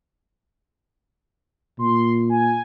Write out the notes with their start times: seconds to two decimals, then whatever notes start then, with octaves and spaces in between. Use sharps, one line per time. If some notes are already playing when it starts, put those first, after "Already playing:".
1.79 A#2 C6
2.30 G#5